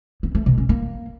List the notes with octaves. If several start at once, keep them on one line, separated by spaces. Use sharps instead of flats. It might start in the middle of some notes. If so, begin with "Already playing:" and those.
B3
A3
B2
C#4
A#3